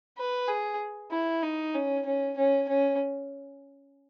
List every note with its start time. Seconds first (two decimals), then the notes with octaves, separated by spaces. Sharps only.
0.18 B4
0.48 G#4
1.12 E4
1.43 D#4
1.74 C#4
2.05 C#4
2.38 C#4
2.69 C#4